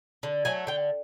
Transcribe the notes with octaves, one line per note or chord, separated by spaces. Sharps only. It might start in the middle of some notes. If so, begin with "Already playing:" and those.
D3
F#3 A3 G#5
D3 G5